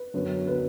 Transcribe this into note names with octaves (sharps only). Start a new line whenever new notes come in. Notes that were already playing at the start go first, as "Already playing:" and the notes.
Already playing: B4
F#2 D3 F#3 B3
D3 F#3 B3 B4